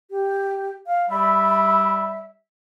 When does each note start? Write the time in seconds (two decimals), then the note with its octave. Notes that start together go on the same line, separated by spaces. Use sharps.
0.10 G4
0.87 F5
1.10 G3 E5 B5